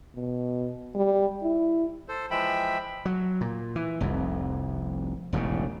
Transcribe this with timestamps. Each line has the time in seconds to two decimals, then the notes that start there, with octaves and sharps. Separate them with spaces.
0.15 B2
0.95 G3
1.42 E4
2.09 A4 C5
2.31 E3 F3 G#3 E5 G5 B5
3.05 F#3
3.41 A#2
3.76 E3
4.00 F1 C2 F2
5.33 E1 A1 G#2 C#3